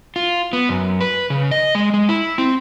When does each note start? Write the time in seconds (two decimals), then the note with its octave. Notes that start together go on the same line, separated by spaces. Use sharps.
0.16 F4
0.53 B3
0.69 F#2
1.01 B4
1.30 C#3
1.51 D#5
1.75 G#3
1.94 G#3
2.09 E4
2.38 C4